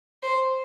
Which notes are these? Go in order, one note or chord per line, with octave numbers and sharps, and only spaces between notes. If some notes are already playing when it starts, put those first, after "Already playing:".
C5